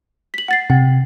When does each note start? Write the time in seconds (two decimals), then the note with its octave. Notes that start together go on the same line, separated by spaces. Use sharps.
0.34 B6 F#7
0.48 F#5 A6 C7
0.70 C3 F#5